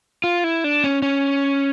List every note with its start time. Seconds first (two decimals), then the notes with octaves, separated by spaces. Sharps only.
0.24 F4
0.44 E4
0.64 D4
0.84 C#4
1.02 C#4